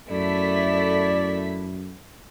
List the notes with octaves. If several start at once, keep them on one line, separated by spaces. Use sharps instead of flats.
F#2 A3 E4 D5 B6